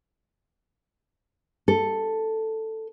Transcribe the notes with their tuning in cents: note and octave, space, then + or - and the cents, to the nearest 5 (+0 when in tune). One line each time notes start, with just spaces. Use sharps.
A4 +5